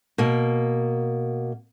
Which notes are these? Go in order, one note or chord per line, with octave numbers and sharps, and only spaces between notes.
B2 A#3